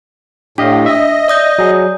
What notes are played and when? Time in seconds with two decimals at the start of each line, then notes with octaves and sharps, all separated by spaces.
0.58 A2 D4 G4 D#5 F5
0.86 D#5 E5
1.28 D5 D#6 G6
1.59 F#3 G#4